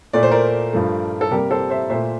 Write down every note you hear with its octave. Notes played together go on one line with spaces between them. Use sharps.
A#2 A3 D5
C5
A#4 D5
G2 F3 A3
A4
C3 G3 A#3 G4 A#4
A4 C5
C5 E5
A#2 A3 C5 E5